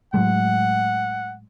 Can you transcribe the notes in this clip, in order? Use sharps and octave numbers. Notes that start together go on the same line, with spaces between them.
A2 F#3 G#3 F#5